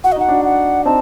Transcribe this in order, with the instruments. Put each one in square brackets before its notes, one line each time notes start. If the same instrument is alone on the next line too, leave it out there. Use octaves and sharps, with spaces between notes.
[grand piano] F#4 [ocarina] F#5
[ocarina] D#5
[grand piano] D#4 [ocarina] F#5
[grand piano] D4 F#4
[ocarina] F#5
[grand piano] C4 D#4 [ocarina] A5